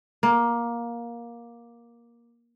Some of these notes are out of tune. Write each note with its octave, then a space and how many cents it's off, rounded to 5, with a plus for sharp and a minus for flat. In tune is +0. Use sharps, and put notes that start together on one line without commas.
A#3 +15